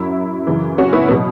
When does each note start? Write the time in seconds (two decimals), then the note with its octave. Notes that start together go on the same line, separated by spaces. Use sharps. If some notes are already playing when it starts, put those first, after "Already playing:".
Already playing: F#2 F#3 E4
0.47 F#2 C#3 E3
0.78 C#4 F#4
0.93 B3 E4
1.08 B2 F#3 B3